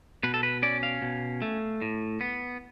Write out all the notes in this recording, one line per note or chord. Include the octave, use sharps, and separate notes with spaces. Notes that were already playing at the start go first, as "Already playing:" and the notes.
B2 B4
A4
B4
C#4 D5
F5
B2
A3
A2
B3